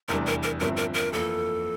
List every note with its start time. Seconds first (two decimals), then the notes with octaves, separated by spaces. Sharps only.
0.08 F1 E2 E3 G3 D4 A#4
0.26 A#4
0.43 A#4
0.60 G1 G2 F3 C4 E4 A#4
0.77 A#4
0.94 A#4
1.13 F2 E3 A#3 F4 A4